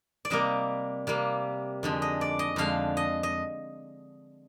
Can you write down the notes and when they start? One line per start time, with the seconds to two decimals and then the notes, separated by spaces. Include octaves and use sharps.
0.25 D5
0.30 C3 G3 A#3 D#5
1.07 C3 G3 A#3
1.83 F2 D3 G#3
2.02 D#5
2.21 D5
2.39 D#5
2.56 F2 D3 G#3 F5
2.97 D#5
3.23 D#5